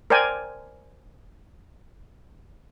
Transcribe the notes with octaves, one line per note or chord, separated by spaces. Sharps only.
A#4 C5 D5 G5 G#5